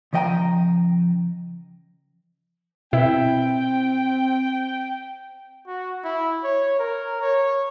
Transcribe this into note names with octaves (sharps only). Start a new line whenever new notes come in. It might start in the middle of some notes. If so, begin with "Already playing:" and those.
C#3 F3 D#5 G5 G#5 A#5
B2 C4 E4 E5 G5
F#4
E4
C#5
A#4
C#5